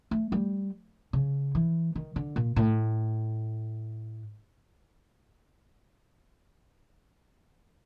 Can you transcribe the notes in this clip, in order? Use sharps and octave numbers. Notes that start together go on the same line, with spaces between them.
A3
G3
C#3
E3
D#3
D3
A#2
A2